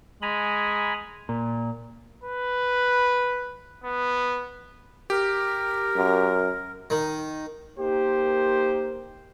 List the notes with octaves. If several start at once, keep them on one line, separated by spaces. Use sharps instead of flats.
G#3 G#5 A#5 B5
A#2
B4
B3
G4 A#4
F#2
D#3
A#3 D#4 G4 A#4 C5